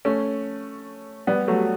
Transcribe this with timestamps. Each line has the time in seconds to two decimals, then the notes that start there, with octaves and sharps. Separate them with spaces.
0.05 A3 C#4
1.27 G3 B3
1.48 F#3 A3